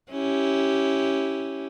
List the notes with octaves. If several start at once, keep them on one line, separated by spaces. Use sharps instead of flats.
C#4 E4 G4